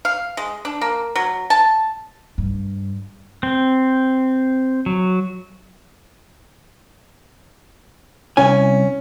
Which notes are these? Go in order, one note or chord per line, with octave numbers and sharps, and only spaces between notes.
F5
G#3
D4
A#3
F#3
A5
G2
C4
F#3
C2 C#4 G#5